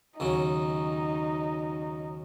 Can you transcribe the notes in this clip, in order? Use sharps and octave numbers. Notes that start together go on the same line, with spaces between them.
D#2 C#3 F#3 D#4